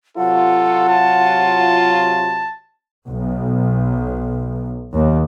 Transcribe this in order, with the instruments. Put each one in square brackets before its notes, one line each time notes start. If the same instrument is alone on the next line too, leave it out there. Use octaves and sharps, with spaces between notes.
[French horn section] C3 F#3 F4 [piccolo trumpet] A4 [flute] F#5
[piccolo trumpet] A5
[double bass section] B1
D#2